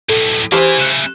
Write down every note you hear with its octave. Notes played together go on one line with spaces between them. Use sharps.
B1 A2 A4
E3 C#4 G4 G#4 C5
C#3 A3 F#6 E7